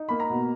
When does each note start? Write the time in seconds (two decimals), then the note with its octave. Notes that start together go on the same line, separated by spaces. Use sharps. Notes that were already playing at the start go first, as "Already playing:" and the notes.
Already playing: D#4
0.09 A#3 B5
0.20 A#5
0.30 B2